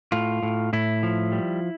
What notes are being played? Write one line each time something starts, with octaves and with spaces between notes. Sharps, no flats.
A2 F4
A2
A2 E4
F3
G3